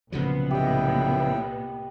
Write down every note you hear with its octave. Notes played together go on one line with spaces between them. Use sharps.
C2 A#2 C#3 F3 F#3 B3
A2 G4 D#5 E5 G5